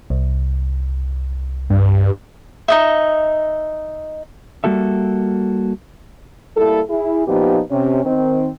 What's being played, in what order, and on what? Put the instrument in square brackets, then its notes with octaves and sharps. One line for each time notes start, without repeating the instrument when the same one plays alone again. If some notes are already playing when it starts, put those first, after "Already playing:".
[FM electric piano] C2
[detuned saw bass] G2
[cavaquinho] D#4 D#5 E5
[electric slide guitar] G3 A#3 F#4 A4 E5
[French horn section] G3 A#3 E4 A4
E4 G#4
A#2 F3 B3 D#4 G4
C3 C#4
D#3 C4